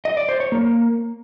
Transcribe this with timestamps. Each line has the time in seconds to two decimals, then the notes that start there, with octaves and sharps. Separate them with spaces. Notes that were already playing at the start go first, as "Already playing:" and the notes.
0.05 D#5
0.17 D5
0.29 C5
0.40 C#5
0.52 A#3